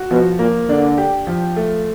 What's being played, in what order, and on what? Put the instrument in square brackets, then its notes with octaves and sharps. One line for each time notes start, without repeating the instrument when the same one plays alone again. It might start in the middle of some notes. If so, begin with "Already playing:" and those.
Already playing: [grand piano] F#4
[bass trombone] B2 [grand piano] F3
[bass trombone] A#2 [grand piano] A#3
[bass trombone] D3 [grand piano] D4
[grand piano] G4
F3
A3